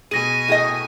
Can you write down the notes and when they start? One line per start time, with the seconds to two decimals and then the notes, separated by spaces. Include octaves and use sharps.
0.11 B2 G#4 G#5 A#6 D#7
0.48 A2 G#4 D#5